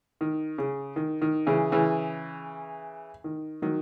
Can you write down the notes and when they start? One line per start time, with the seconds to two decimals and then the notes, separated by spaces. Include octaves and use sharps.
0.21 D#3
0.58 C#3
0.96 D#3
1.22 D#3
1.47 C#3 E3
1.72 C#3 E3
3.24 D#3
3.62 D#3 F#3